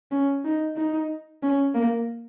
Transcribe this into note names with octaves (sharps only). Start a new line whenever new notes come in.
C#4
D#4
D#4
C#4
A#3